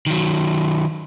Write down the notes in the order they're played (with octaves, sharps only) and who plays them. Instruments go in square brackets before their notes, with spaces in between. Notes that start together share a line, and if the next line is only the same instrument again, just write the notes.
[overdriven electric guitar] D#3 F#3